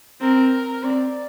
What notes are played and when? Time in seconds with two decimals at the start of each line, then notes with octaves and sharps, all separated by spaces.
0.21 C4 A#4
0.83 C4 D5